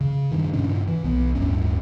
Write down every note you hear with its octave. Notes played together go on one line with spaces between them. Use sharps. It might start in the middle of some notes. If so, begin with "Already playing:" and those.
C#3
G2 D#3
G2 A#2 C#3 C#4
E3
B1 B3
D1 G2 C#4